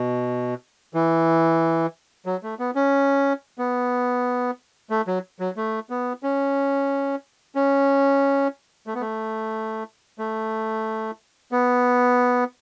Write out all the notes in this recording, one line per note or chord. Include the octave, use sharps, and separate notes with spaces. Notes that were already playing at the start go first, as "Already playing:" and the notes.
Already playing: B2
E3
F#3
A3
B3
C#4
B3
A3
F#3
F#3
A3
B3
C#4
C#4
A3
B3
A3
A3
B3